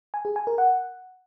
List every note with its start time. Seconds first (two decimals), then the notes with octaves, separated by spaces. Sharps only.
0.14 G#5
0.25 G#4
0.36 G#5
0.47 A#4
0.58 F#5